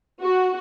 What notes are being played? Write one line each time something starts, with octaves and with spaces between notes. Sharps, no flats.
F#4